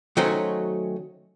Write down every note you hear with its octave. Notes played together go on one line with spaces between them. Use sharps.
D#3 F#3 A3 C#4 F#4 C5